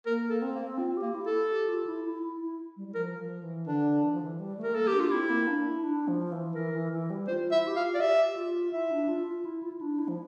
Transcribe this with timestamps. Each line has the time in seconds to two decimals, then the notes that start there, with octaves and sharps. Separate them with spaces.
0.06 A#3 A#4
0.30 A4
0.42 C4
0.55 A#3
0.78 C4 F4
0.97 G4
1.02 A#3
1.15 E4
1.27 A4
1.50 G4
1.69 F4
1.86 E4
2.05 E4
2.23 E4
2.41 E4
2.77 G3
2.88 G3
2.95 F3 A#4
3.19 F3
3.43 E3
3.67 D3 D4
4.03 E3
4.13 F3
4.22 E3
4.39 G3
4.57 A3
4.64 A#4
4.71 A3
4.75 A#3 A4
4.87 G4
4.93 D4
5.00 F4
5.12 C4 E4
5.30 A#3
5.48 D4
5.65 E4
5.84 D4
6.08 F3
6.32 E3
6.55 E3 A#4
6.74 E3
6.92 E3
7.10 G3
7.28 F4 C5
7.52 E4 E5
7.67 G4
7.76 F4 F5
7.95 D5
8.01 G4 E5
8.30 G4
8.37 F4
8.73 E4 E5
8.91 D4
9.08 F4
9.27 F4
9.45 E4
9.63 F4
9.72 E4
9.81 D4
9.99 E4
10.08 F3